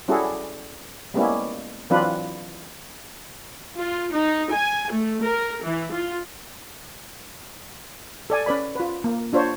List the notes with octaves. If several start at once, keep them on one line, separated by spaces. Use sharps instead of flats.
G3 C#4 E4 F#4 G#4 A4
G3 G#3 A#3 B3 C#4 E4
E3 F#3 C4 D4 F4 B4
F4
D#4
G#5
A3
A#4
E3
F4
A4 D5 G#5
C#4 B4 D5 B5
F4 B4
A#3
D4 F4 C5 C#5